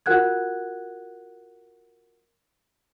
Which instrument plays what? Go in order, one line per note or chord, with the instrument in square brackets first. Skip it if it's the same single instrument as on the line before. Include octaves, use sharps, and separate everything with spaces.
[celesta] F4 F#4 A#4 F#5 F#6 G#6